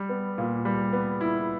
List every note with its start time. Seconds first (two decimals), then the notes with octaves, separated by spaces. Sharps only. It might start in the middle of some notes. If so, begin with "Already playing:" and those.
Already playing: G3
0.09 B3
0.38 A#2
0.65 G3
0.93 B3
1.21 E4